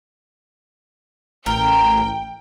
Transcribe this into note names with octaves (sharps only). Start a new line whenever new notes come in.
A1 A#4 G5